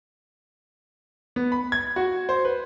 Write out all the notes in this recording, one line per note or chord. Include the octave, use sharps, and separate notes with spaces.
B3
B5
G#6
F#4
C5
B4